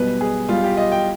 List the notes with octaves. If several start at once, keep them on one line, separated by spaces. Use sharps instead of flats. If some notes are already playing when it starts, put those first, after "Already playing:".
Already playing: B1 B2 G3 B4
G#4
B1 B2 G3 F4
G4
D#5
G5